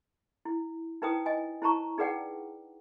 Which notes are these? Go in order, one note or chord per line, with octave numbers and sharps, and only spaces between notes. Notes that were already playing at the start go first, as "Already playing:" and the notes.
E4
D#4 E4 B4 C5 G5 D#6
D#5 G#5
E4 C5 A5 A#5 C#6
D#4 G#4 B4 D5 F#5 G5